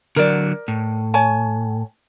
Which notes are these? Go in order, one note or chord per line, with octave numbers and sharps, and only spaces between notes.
D3 F#3 A#4 D5
A2
C#5 G#5 A5